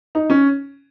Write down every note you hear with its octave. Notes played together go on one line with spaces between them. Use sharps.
D#4
C#4